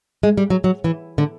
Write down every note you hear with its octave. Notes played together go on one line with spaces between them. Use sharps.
G#3
G3
F#3
F#3
E3
D3